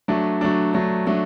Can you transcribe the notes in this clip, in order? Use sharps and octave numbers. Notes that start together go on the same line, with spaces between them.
F#3 A3 D4
F#3 A3 D4
F#3 A3 D4
F#3 A3 D4